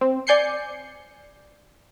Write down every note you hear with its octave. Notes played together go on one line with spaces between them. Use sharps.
C4
D5 G#5 G6 C7 C#7